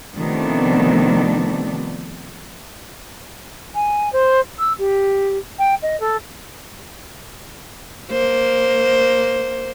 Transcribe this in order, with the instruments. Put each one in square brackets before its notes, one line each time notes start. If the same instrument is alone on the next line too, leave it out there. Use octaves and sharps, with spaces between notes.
[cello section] C3 D#3 F3 A3 B3 D4
[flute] G#5
C5
E6
G4
G5
D#5
A4
[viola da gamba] A#3 C5